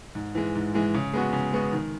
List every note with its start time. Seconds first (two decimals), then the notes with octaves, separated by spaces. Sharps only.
0.15 G#2
0.35 E3 G#3
0.55 G#2
0.74 E3 G#3
0.94 C#3
1.14 G#3 B3 F#4
1.33 C#3
1.53 G#3 B3 F#4
1.72 D#3